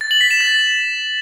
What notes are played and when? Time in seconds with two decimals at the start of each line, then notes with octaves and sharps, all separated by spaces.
0.01 A6
0.11 F#7
0.21 B6
0.31 E7
0.40 A6